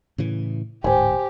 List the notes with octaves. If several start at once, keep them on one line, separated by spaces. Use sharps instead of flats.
A2 C#3 E3
D1 G#2 G4 C5 G#5